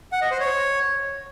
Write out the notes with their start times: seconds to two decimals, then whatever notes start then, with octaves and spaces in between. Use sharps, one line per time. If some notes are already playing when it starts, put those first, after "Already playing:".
0.12 F#5
0.22 D#5
0.31 C5
0.40 C#5